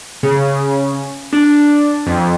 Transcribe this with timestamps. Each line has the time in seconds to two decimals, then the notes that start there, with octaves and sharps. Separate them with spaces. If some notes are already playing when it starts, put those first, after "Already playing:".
0.23 C#3
1.33 D4
2.06 F2